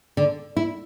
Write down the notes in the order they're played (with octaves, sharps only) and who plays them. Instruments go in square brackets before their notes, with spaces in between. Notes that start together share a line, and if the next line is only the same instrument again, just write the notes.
[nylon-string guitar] D3
E4